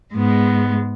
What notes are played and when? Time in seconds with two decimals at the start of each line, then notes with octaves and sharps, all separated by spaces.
0.13 G#2 G#3 B3